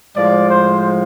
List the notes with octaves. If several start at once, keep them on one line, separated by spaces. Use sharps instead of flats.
A2 F3 G#3 D5
C5